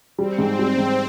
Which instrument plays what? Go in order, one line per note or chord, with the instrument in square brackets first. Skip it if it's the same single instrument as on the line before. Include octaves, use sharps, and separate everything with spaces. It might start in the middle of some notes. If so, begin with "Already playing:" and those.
[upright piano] G3 [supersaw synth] C4
[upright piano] G#2
G3
G#2